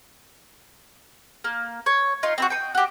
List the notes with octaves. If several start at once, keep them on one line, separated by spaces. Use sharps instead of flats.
A#3
C#5
D#4 F4 C6
C4 E4 F#4
G5 C#6 D#6
F#4 G4